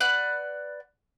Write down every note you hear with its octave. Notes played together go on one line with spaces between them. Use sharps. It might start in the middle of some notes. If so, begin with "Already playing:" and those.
B4 D5 F#5